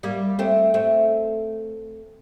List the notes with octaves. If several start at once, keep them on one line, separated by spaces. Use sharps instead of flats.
G3 A#3
A3 C4
A3 C4